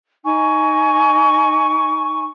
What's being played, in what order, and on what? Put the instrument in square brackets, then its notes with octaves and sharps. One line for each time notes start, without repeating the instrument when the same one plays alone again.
[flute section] D#4 G#5 C#6